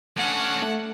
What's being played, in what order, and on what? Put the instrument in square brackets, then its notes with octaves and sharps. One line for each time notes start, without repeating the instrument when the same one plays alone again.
[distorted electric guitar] A2 C#4 [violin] D4 F#5
[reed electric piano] A3